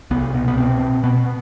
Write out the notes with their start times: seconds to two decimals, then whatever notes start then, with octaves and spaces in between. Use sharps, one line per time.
0.11 C2 B3
0.34 B2
0.48 B3
0.57 B2 C4
0.81 B2
1.04 B2 B3